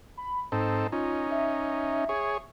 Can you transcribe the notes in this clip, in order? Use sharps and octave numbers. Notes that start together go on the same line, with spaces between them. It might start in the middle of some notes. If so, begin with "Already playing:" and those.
B5
G#2 C4 D#4 A4
C#4 D#4 F4
E5
G#4 C#5